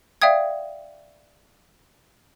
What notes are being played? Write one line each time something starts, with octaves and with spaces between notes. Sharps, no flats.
D5 E5 F5 G5 D#6 G#6